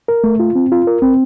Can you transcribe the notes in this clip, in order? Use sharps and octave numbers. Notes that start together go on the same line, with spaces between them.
A#4
A3
F4
C4
F4
A#4
C4